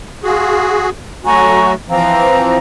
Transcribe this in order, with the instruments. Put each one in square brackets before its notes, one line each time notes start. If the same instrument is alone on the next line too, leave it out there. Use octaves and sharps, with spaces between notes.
[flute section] F4 [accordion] F#4 G#4
[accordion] F#3 A3 F#4 [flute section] G#5 A#5 C#6
[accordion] E3 F3 C4 [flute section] F5 A#5